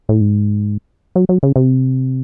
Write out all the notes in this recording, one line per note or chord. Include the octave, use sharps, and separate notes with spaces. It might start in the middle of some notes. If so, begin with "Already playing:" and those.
A2
G#2
F#3
F#3
C#3
C3